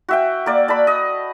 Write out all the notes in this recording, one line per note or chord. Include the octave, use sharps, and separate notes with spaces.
F#4 E5 G5
A#3 D5
D5 A5 B5
D#5